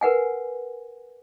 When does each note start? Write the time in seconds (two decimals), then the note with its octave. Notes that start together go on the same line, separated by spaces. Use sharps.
0.01 A#4 B4 F#5 G#5